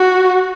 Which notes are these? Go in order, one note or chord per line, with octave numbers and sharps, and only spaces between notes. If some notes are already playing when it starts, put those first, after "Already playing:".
Already playing: F#4